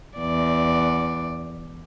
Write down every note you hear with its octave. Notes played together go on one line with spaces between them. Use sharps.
E2 D5